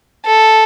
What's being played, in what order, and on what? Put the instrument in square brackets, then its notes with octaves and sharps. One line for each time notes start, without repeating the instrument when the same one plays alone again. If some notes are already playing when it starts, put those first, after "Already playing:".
[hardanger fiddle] A4